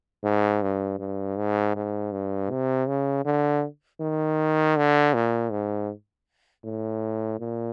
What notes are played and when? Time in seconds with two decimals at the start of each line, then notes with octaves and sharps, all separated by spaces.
0.24 G#2
0.62 G2
0.99 G2
1.37 G#2
1.75 G#2
2.12 G2
2.51 C3
2.88 C#3
3.25 D3
4.00 D#3
4.77 D3
5.14 A#2
5.51 G#2
6.65 A2
7.40 A#2